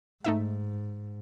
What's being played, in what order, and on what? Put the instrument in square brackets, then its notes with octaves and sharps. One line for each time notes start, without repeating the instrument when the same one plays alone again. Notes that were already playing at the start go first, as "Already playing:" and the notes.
[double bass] G#2 [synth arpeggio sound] A3 D#4 E5